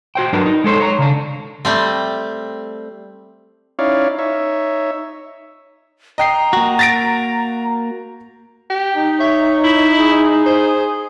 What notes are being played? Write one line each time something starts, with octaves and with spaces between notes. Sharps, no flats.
F#4 C5 G5
G2 F#3 D4 A#4 B4
D#4
G#3 A4 C5 C#5
C#5 A#5
C#3 D4
G3 A3 C4
C#4 D#4 E4 C#5 D5 F5
D#4 C#5 E5
D#5 G5 A#5 C7
A#3 F#4
A6 A#6 D7
G4
D#4
C#5 E5
E4
G#4
C5